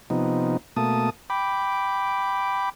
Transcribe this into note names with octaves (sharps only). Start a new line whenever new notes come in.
C3 F3 B3 D#4
B2 A3 A#3 A5 D#6
G5 B5 D6